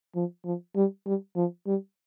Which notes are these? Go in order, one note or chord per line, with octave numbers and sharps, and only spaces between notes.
F3
F3
G3
G3
F3
G3